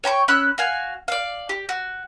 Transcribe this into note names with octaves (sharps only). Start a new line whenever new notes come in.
C#5 G5 A#5 C#6
C#4 B5 E6 F#6
F#4 F5 G#5
D5 F5
G4
F#4